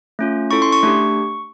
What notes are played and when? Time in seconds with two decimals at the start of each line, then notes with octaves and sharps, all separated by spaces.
0.19 A3 C#4 F4
0.51 C#4 E4 A4 C#6
0.62 C6
0.72 C#6
0.83 A3 D4 G4